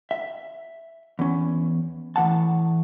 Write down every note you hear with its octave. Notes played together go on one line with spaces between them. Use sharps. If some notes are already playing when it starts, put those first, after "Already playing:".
E5
E2 C#4
A2 E3 B3 F#5 A5